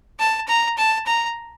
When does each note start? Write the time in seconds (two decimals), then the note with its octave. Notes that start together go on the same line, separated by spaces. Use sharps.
0.19 A5
0.48 A#5
0.77 A5
1.06 A#5